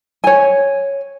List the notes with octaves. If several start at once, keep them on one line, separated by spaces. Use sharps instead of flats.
C#5 G#5